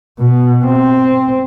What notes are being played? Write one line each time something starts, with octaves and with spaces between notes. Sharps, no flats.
B2
C4